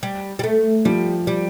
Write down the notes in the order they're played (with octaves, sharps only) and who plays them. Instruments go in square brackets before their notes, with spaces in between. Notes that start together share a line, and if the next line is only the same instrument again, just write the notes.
[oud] G3
G3
A3
[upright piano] F3 [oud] G3
[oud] G3